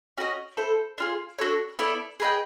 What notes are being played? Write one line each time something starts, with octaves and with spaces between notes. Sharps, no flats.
C#4 F#4 A#4 D#5
E4 A4 C5
D4 F4 G#4
D4 F#4 A4 C#5
B3 E4 A4 D5
G#4 B4 D#5 G5